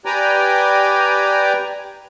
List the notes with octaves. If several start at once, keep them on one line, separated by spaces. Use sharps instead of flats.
G4 B4 D5 G5 G#5 A#5